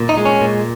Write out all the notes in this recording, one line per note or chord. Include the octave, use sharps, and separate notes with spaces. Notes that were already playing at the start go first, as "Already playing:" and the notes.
Already playing: A#2
D#4
G#3
C#4
A#2